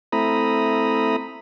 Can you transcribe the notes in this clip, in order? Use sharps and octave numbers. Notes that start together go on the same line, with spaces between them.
A3 C4 E4 A#5 B5 D#6